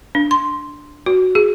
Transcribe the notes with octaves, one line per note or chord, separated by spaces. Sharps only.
D4
C6
F#4
G#4